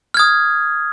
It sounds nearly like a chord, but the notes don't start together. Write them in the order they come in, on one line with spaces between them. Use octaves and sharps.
F6 G#6 D#6